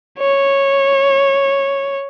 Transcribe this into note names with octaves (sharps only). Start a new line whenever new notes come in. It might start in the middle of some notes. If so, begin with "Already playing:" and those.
C#5